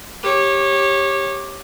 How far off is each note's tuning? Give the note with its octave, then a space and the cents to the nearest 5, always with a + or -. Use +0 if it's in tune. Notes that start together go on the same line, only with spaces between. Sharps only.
G4 +5 C#5 -20